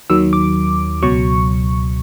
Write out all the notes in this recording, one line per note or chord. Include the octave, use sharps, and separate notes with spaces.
D#2 D#3 F#3 E6
D6
C#2 B2 F#3 C#6